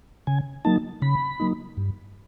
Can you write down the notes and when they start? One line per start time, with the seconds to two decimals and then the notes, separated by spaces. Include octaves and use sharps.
0.27 C#3 G#5
0.65 F#3 A#3 D#4 A5
1.02 C#3 B5
1.40 F#3 A#3 D#4
1.77 G2